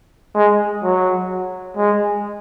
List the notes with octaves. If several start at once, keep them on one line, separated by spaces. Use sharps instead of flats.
G#3
F#3
G#3